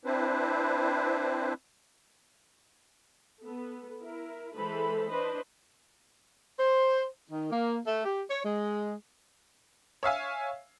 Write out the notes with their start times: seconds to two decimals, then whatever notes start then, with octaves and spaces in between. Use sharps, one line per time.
0.05 C4 D4 E4 B4 C5
3.43 B3 A4
4.04 E4 A#4
4.56 E3 G#3 A4 B4 C5 B5
5.10 D4 B4 C5 D#5
6.59 C5
7.31 D#3
7.51 A#3
7.85 A3
8.05 G4
8.30 C#5
8.45 G#3
10.03 C#5 E5 F5 G#5